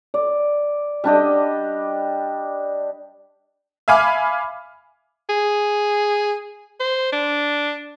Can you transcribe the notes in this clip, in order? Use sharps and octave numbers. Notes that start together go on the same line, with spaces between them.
D5
G3 D4 G4 D#5
E5 F5 G#5 B5 D6 F6
G#4
C5
D4